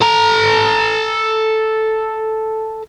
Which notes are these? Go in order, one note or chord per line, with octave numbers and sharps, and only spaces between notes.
A4 A#5